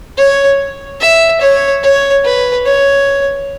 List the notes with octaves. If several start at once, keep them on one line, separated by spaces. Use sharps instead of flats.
C#5
E5
C#5
C#5
B4
C#5